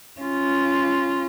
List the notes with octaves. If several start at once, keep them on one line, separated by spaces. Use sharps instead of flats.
C#4 F4